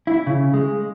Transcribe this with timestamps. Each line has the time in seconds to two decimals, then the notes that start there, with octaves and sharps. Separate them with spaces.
0.07 E4
0.27 C#3
0.54 G#3